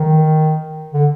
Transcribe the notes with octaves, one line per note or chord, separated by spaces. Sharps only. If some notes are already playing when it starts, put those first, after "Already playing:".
Already playing: D#3
D3